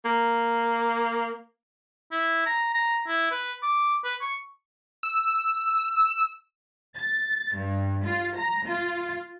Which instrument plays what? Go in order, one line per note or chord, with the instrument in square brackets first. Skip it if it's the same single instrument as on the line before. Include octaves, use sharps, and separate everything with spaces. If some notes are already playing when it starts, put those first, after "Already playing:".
[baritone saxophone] A#3
[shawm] E4
A#5
A#5
E4
B4
D6
B4
C#6
[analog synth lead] E6
[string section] A6
G2
F4
A#5
F4